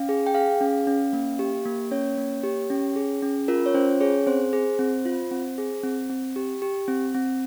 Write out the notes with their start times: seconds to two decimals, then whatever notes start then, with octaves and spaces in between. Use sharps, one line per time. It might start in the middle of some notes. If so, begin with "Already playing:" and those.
Already playing: C#4 F5
0.09 G#4
0.27 G5
0.34 G#4 F5
0.61 C#4
0.87 C#4
1.13 A#3
1.39 G4
1.66 A#3
1.91 C#4 C#5
2.18 A#3
2.44 G4
2.70 C#4
2.96 G#4
3.22 C#4
3.48 F4 A#4
3.66 C#5
3.74 C#4 C5
4.01 G#4 C#5
4.27 C4 C5
4.53 G#4
4.79 C4
5.05 F4
5.31 C4
5.58 G#4
5.84 C4
6.10 C4
6.36 G4
6.62 G4
6.88 C4
7.14 C4